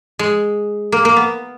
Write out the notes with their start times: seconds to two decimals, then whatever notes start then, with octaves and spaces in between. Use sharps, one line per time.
0.19 G#3
0.92 A#3
1.05 A#3
1.17 B3